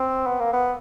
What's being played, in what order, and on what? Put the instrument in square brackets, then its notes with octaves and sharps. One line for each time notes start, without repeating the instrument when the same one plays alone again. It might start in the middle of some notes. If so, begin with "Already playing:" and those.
Already playing: [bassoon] C4
B3
A#3
B3